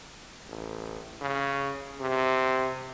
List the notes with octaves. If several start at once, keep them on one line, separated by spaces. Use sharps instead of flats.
A1
C#3
C3